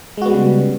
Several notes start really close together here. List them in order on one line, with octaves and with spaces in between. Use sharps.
G#3 F#4 B3 G3 C#3